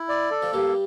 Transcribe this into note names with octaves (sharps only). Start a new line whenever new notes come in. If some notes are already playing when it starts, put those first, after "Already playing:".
Already playing: E4
D5
A4
F3
G2 G3 A#3